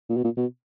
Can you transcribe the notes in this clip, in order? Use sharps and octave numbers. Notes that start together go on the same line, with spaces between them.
A#2
B2
A#2
B2